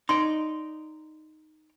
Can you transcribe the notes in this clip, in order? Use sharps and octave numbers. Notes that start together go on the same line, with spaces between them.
D#4 D5 C6